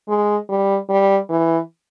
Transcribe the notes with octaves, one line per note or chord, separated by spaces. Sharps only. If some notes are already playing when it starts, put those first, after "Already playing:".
G#3
G3
G3
E3